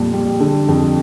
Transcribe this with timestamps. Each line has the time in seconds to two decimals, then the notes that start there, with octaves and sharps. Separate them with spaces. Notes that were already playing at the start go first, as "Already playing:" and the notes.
Already playing: F2 A#2 G3
0.14 G3
0.40 D3
0.69 F2